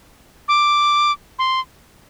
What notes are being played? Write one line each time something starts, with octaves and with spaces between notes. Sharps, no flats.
D6
C6